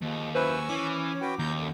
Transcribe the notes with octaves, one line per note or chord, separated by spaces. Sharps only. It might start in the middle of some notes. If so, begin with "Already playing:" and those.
D#2 F3 G#3
F#2 E4 B4 C5 G#5 C#6 E6
E3 C#4 D6
F#4 B4 G5
D#2 A#5 G6
F#2 D3 D#3